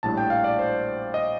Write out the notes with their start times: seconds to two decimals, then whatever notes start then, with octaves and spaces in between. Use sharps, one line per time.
0.03 A#1 A2 G3 A5
0.18 G5
0.30 F5
0.44 D5
0.59 C5
1.14 D#5